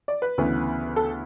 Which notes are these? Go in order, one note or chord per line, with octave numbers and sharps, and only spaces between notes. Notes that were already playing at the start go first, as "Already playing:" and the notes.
D5
B4
D2 C#3 E3 B3
A4